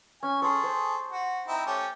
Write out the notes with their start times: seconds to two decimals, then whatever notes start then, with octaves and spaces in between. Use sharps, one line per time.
0.23 C#4 G#5
0.42 G#4 A4 C#5 C6
0.64 C5
1.12 F#4
1.48 C4 D#4 E4
1.66 A3 C#4 G4